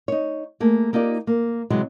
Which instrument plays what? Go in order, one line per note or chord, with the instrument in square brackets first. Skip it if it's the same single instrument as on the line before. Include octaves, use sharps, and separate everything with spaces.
[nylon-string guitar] D#4 C#5
A3 A#3 G#4
A#3 D#4 F4 G4 D5
A#3
C3 E3 F#3 G#3